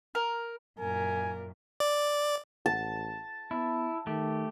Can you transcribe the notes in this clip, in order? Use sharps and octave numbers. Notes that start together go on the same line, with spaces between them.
A#4
F#2 A#2 A#4 G#5
D5
A1 A5
B3 E4
D#3 A3 G4